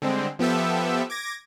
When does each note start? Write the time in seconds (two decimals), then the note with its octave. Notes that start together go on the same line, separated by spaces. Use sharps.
0.02 D3 G3 G#3 C4
0.39 F3 B3 G4 A4 E5
1.10 D6 G#6 A#6